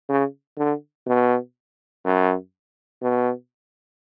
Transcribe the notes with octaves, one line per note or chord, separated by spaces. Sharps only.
C#3
D3
B2
F#2
B2